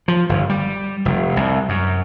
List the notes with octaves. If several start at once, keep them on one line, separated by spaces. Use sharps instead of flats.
F3
G1
G3
F1
C2
F#2